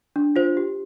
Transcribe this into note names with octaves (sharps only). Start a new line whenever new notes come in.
D4
F4 C5
G4